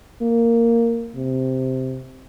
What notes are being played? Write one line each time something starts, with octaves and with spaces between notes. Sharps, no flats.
A#3
C3